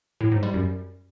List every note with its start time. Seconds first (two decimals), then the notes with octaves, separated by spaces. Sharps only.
0.21 A2
0.32 G#2
0.43 G3
0.54 F#2